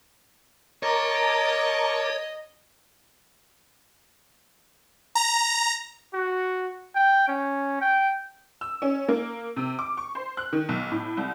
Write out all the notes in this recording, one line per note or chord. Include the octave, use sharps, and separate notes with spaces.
A#4 C#5 D#5 A5 A#5 D6
A#5
F#4
G5
C#4
G5
E6
C#4
A#3
C3
D6
C#6
C5
F#6
D#3
B1
A2
C2